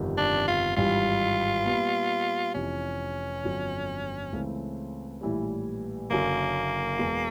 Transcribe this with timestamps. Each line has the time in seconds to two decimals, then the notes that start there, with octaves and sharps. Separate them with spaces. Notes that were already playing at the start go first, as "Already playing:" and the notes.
Already playing: G1 F2 C3 D#3 G3
0.17 D4
0.48 F4
0.76 G#1 G2 E3 G3 F4
1.65 A#2 G3 B3
2.55 F1 F2 C3 E3 C#4
3.43 G1 F2 D3 F#3
4.32 C#2 C#3 E3 A3 C4
5.21 A#1 A2 E3 G3
6.10 F#1 F#2 D3 F#3 A#3
6.99 E2 B2 G#3